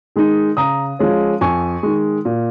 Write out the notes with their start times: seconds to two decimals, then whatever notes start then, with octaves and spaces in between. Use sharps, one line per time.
0.16 D#3 G#3 D#4
0.57 C#3 A#5 D#6
0.99 F3 G#3 C#4
1.41 F2 G#5 C#6
1.83 D#3 G#3
2.25 A#2